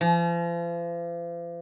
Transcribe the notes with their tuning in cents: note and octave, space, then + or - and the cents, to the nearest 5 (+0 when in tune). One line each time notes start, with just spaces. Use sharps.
F3 -40